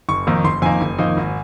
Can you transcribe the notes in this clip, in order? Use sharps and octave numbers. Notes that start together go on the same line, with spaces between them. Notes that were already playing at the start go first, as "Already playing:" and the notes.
F#1 C#6
F2 D#3 A#3 D#4
F#1 C6
F2 D#3 A#3 D#4 G#5
F#1
F2 D#3 A#3 D#4
G#1